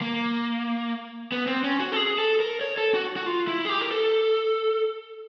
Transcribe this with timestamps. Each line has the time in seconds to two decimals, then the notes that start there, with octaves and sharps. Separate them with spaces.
0.01 A#3
1.32 B3
1.47 C4
1.64 C#4
1.80 F#4
1.92 A4
1.96 G#4
2.18 A4
2.40 A#4
2.61 C#5
2.78 A4
2.94 F#4
3.16 F#4
3.26 F4
3.48 E4
3.65 G#4
3.69 G4
3.81 A#4
3.91 A4